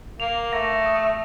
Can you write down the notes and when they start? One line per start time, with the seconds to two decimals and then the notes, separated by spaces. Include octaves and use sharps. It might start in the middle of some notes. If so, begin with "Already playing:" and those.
0.20 A#3 F7
0.53 A3 A#6
0.86 D#6